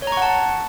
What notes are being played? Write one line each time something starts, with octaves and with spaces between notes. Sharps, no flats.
C#5
A#5
C#6
F#5
A5